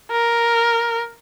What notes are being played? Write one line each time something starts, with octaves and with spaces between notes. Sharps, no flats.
A#4